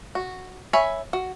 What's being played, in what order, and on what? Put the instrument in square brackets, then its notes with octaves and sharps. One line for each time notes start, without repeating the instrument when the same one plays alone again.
[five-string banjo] F#4
C#5 E5 G#5 B5
F#4